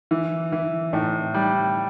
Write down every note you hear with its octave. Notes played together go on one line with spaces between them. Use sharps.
E3
E3
A2
G3